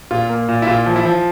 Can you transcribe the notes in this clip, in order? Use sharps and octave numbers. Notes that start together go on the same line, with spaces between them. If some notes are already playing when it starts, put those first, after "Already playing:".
A#2 F4
A#3
A#2
E4
A#2 F4
F3
E4
F3